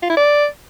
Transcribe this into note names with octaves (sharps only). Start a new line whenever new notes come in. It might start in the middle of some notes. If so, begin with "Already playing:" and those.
F4
E4
D5